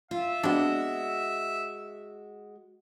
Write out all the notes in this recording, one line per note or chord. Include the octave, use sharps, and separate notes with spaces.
F4 E5
G#3 B3 C4 D4 F#4